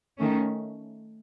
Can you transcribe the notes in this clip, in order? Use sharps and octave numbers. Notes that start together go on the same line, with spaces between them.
D#3 A3 C#4